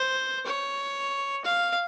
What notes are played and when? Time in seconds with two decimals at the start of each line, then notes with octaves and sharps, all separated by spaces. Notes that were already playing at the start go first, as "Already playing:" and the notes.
Already playing: C5
0.46 C#5
1.45 F5